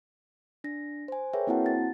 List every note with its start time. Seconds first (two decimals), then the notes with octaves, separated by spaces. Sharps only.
0.64 D4 A#6
1.08 C5 G#5
1.33 G#4 A#4 B4 C#5 E5 G5
1.47 A#3 C4 E4 F#4 F#5 A5
1.66 A6